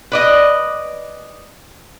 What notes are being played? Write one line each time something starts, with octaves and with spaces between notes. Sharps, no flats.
B4 D5 D#5